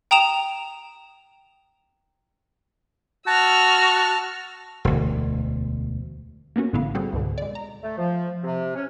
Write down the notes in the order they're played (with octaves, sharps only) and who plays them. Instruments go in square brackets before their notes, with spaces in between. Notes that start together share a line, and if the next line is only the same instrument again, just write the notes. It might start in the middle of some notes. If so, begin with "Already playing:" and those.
[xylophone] G5 A#5 D#6 E7 F7
[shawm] F#4 [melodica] A5 [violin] E6 F6
[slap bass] E1 D2
[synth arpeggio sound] A#3 B3 C#4 F#4
A#1 A2 D3 B3 E4 F5
G3 C4 F#4 G#4 A4
C#2 G#2 B2 D3
G#3 D5
A#5
[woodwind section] A3
F3
C3
C#4